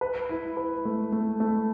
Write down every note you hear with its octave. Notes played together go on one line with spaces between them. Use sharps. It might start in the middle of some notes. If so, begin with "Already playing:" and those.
B4
E4
B4
A3
A3
A3